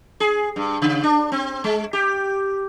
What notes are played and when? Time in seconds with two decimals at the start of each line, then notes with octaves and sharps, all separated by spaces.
0.20 G#4
0.56 G2
0.82 C#3
1.03 D4
1.32 C4
1.64 G#3
1.93 G4